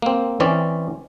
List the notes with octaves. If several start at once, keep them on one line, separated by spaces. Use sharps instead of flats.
A#3 C4
E3 C4 C#4 D5